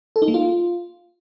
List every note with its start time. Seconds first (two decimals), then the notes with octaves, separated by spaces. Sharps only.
0.16 A4
0.22 D#4
0.28 A#3
0.34 F4